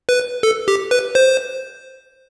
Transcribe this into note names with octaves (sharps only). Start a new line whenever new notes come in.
B4
A4
G4
B4
C5